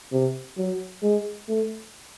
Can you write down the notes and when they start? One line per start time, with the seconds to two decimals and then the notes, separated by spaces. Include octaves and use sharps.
0.12 C3
0.57 F#3
1.02 G#3
1.48 A3